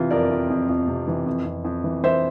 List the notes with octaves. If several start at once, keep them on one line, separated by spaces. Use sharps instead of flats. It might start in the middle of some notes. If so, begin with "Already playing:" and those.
Already playing: C3 E3 F4
F2 A#4 D5
F2
F2
F2
C3
E3
F2
F2
F2
E3
E3 C5 E5